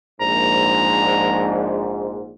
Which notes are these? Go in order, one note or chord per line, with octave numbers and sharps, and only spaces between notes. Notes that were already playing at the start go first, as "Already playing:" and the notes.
A#1 G#2 A#5